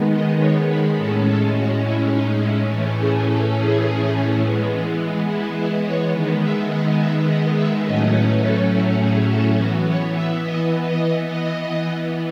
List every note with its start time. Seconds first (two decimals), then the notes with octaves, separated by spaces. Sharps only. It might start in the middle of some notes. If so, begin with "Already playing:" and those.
Already playing: D#3 G#3 B3
0.11 D#5
0.39 C#5
0.68 B4
0.97 A2 G#3 C#4 A4
1.26 A4
1.54 F#4
1.83 E4
2.12 D#4
2.40 E4
2.69 A2 E3 A3 C#4
2.98 G#4
3.26 A4
3.55 G#4
4.41 E3 G#3 B3
5.27 E4
5.56 E4
5.84 C#5
6.13 D#3 G#3 B3
6.42 E5
6.70 D#5
6.99 E5
7.27 D#5
7.55 E5
7.84 A2 F#3 A3 C#4 D#5
8.13 B4
8.42 A4
8.71 E4
8.99 G#4
9.28 A4
9.56 E3 B3 F#4
9.85 C#5
10.14 E5
10.42 D#5
10.86 D#5
11.28 E3 B3 D#5